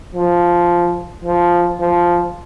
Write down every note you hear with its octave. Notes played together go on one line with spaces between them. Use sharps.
F3
F3
F3